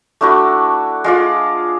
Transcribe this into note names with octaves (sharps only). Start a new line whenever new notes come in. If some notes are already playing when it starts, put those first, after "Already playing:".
A3 D4 E4 F#4
G#3 F4 D5